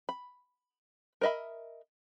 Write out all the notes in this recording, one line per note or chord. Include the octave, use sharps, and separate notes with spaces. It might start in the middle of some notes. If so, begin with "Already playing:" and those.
B5
A#4 C5 D#5 E5 B5